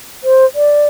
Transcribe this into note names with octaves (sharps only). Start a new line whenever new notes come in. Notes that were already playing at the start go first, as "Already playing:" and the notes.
C5
D5